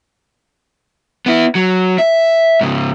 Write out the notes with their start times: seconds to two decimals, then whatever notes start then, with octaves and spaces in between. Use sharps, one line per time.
1.26 B3 E4
1.55 F#3
1.98 E5
2.61 G#2 C#3